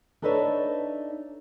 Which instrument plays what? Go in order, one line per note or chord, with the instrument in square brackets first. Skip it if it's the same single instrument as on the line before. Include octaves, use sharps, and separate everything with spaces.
[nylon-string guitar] D4 D#4 A4 B4 C#5 E5